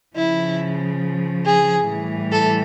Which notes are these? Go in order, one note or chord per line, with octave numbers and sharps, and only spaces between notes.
C#3 F3 E4
G#4
A2 E3 G3
A4